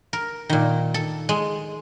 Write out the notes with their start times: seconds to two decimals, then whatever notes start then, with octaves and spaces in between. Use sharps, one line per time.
0.13 A#4
0.49 A#2 D#3
0.94 A4
1.29 G#3